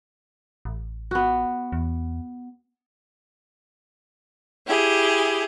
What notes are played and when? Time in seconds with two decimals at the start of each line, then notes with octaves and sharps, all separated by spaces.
0.65 A1
1.11 B3 F#4
1.72 E2
4.66 E4 G4 G#4